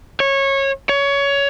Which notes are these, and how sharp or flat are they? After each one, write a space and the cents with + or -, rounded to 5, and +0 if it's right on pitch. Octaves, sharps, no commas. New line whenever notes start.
C#5 -20
C#5 +20